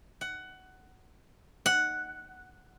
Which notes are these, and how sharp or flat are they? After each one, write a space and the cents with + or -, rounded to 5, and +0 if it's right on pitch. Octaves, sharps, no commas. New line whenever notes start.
F#5 +15
F#5 +0